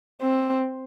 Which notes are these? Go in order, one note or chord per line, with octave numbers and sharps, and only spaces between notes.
C4